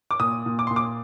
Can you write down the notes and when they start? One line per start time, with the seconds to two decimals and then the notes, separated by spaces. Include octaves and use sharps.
0.11 D6
0.19 A#2 D#6
0.46 A#2
0.59 D6
0.67 A#2 C6
0.76 D6